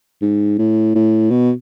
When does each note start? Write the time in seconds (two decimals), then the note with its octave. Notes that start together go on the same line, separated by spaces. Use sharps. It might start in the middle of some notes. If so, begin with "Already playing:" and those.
0.22 G#2
0.58 A2
0.95 A2
1.31 B2